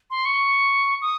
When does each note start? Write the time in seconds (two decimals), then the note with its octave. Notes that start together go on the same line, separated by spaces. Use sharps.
0.10 C6
0.25 C#6
1.02 D#6